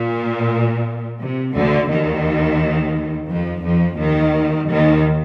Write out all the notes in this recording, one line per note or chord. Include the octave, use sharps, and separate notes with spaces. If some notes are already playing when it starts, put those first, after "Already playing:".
Already playing: A#2
C3
D2 D3
D#2 D#3
F2 F3
F2 F3
D#2 D#3
D#2 D#3